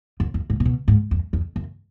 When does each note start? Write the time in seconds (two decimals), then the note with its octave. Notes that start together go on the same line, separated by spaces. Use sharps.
0.20 F#2
0.34 F#2
0.50 G#2
0.60 A#2
0.65 B2
0.88 G#2
1.11 F2
1.33 F2
1.56 F#2